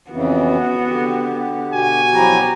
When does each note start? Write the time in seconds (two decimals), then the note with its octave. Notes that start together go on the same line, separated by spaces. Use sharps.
0.11 F2 C#3 E3 B3 F#4
0.86 D3 G4
1.74 B2 F#4 G#5
2.13 F3 F#3 E4 G4 A#5